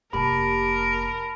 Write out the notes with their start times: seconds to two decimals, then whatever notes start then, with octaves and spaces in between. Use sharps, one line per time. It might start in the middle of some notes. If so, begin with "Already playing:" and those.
0.13 F1 A#3 G4 A#4 A5 B5